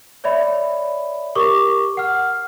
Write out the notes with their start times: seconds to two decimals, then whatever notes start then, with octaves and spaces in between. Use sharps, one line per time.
0.24 C#5 D5 E5 B5
1.35 G4 A#4 C#6 D6
1.97 F#5 F6